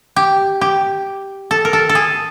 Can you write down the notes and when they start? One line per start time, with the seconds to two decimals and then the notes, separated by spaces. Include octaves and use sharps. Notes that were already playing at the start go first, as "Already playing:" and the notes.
0.16 G4
0.61 G4
1.51 A4
1.65 A#4
1.73 A4
1.89 A4
1.95 G#4